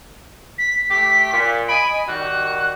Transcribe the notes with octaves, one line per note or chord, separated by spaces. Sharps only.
B6
A3 G4 B6
A#2
D#5 G#5 B5 D7
D#3 G3 F#4 F#6